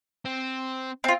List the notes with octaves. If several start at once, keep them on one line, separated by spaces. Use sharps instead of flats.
C4
C4 F4